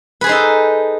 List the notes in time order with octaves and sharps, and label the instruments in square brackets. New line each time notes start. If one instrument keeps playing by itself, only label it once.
[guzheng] B4
G#4
C5
D#4
A4